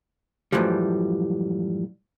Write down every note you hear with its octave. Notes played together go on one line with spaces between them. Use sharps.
F#2 A2 E3 F3 G3